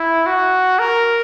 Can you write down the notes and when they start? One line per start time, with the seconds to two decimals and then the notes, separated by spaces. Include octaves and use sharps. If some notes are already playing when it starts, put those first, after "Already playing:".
Already playing: E4
0.26 F#4
0.79 A#4